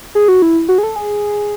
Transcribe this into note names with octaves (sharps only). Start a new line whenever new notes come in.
G#4
F#4
E4
F#4
G#4
A4
G#4